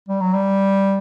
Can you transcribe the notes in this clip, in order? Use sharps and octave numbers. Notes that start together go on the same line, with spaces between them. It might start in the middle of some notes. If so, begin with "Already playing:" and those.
G3
F#3
G3